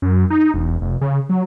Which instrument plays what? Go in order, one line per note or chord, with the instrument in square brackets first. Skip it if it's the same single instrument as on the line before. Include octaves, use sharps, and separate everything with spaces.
[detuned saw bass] F#2
D#4
E1
F1
C#3
F#3